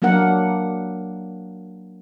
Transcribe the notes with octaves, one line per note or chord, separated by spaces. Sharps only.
F#3 A#3 D4 A#4 F#5